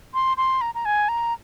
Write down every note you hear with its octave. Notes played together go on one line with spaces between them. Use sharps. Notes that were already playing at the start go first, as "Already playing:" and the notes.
C6
C6
A#5
A#5
G#5
A#5